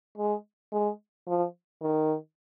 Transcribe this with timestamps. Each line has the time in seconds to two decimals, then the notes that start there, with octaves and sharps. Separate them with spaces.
0.18 G#3
0.72 G#3
1.27 F3
1.82 D#3